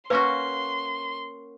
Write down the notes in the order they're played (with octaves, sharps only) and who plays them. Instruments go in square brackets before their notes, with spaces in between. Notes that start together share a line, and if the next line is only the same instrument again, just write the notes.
[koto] A#3 C#4 F#4 [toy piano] B4 F5 [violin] C6